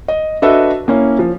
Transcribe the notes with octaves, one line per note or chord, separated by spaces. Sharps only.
D#5
D4 F#4 A4 B4 D#5 E5
A#3 C#4 E4
F3